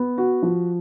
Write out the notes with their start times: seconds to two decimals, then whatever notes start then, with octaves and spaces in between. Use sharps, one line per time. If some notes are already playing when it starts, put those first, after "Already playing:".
Already playing: B3
0.18 F#4
0.43 F3